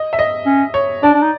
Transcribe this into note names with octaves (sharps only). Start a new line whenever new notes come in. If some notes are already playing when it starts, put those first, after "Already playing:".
Already playing: D#5
E5
D#5
C#4
C#5
D4 D5
D4
D#4